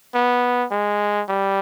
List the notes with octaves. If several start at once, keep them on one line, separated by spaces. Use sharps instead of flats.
B3
G#3
G3